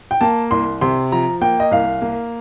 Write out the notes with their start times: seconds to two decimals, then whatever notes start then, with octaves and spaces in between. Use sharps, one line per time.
0.11 G5
0.21 A#3 A5
0.51 C2 C6
0.81 C3 C6
1.12 F3 A#5
1.41 A#3 G5
1.60 D#5
1.71 C2 F5
2.02 A#3